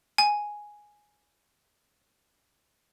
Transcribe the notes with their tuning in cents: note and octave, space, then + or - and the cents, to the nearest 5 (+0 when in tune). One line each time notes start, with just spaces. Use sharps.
G#5 +0